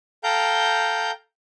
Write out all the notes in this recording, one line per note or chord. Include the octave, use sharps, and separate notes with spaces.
A4 F5 G5 A#5 G6